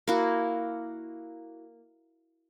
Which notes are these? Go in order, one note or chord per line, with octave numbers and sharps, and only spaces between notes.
A#3 E4 F#4